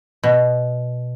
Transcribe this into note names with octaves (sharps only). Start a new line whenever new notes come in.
B2